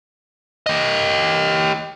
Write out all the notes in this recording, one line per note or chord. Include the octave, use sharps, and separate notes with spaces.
G4 D#5